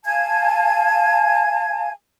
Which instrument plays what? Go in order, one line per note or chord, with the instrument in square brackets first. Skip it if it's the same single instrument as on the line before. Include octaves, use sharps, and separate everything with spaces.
[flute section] F5 G#5 A5 G#6